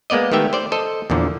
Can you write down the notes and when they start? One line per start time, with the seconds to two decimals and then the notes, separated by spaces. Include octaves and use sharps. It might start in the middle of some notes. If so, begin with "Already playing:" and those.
0.10 G#3 A#3 B3 D5 D#5
0.32 D#3 A3 B3 G4 E5 G5
0.53 C5 D5
0.72 A4 C5 D#5
1.10 E2 A#2 D3 F3